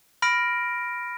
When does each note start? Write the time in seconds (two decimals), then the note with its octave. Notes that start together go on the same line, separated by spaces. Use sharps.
0.22 B5 F6 A#6 D7